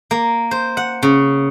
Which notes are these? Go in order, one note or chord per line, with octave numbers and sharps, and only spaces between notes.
A#3
C5
F#5
C#3